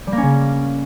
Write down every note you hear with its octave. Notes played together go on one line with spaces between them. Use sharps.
G3
A#3
C#4
C#3